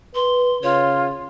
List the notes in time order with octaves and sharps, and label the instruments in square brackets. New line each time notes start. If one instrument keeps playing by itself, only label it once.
[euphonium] B4 [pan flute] C6
[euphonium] C#3 [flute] F4 [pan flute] C#5